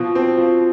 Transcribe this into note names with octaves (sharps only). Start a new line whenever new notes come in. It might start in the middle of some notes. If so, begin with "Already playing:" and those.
Already playing: B2 F3
C4
F3